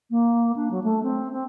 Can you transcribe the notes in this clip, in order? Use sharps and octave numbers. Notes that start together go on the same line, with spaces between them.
A#3
D4
F#3
A3
C4
C4